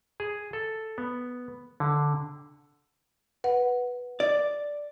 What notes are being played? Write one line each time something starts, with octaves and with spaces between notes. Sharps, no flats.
G#4
A4
B3
D3
B4 F#5
D5